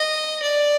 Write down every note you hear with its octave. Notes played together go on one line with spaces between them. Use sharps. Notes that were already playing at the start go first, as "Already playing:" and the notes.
Already playing: D#5
D5